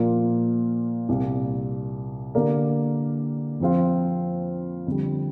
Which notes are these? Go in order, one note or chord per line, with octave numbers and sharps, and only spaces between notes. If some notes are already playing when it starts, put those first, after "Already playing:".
Already playing: A#2 F3 A#3 F4 A#4
C2 A#2 A#3
D3 A#3 G4 A#4 D5
F2 F3 C4 F4
F2 D3 G3